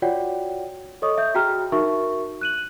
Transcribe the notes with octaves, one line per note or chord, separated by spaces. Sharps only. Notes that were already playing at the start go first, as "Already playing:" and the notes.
F4 F#4 C#5 D5 F#5 G5
A4 C#5 D#5 C#6 D#6
E5 G6
F#4 G#4 G5 A#5 F6
D#4 F#4 A#4 E5 C#6
F#6 D#7 F#7